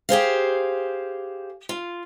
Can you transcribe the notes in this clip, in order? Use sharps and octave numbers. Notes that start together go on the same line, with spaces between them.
G4 G#4 C5 F5
F4